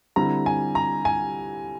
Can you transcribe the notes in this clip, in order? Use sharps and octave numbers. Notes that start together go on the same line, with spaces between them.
D3 G3 C4 E4 A#5
G#5
A#5
G#5